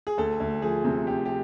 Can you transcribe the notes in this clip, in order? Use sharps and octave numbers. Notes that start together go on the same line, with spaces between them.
G#4
D2 A4
D2
F3 G#4
C3
D2 G4
G4